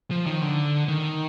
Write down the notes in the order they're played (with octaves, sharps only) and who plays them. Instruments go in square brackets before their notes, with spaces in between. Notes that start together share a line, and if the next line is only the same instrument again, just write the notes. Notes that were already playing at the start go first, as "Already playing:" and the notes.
[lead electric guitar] F3
D#3
D3
D#3